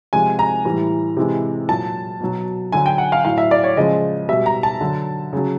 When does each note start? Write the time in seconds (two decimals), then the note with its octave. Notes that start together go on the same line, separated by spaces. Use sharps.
0.13 C3 F3 G#3 G#5
0.39 A#5
0.65 A2 E3 G3
1.17 C3 E3 G#3
1.69 A#2 F#3 A5
2.21 B2 F#3
2.72 D3 F#3 G#5
2.86 G5
2.98 F#5
3.12 F5
3.25 A2 F#3 F5
3.38 E5
3.51 D5
3.64 C#5
3.77 C#3 F3 G#3 D#5
4.29 B2 G3 E5
4.46 A#5
4.63 A5
4.81 D3 F#3
5.33 C#3 F#3